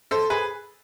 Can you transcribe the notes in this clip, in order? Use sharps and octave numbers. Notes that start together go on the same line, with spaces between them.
A4 C5
G#4 B4